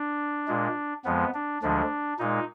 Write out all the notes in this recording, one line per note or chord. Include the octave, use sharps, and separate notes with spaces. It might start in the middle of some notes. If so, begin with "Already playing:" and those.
Already playing: D4
A#2 G#3
F2 F3 G#3 B3
D4
D2 D3 F3 G#3 D4
A#2 G#3 D#4